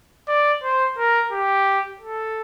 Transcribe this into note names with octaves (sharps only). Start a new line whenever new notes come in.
D5
C5
A#4
G4
A4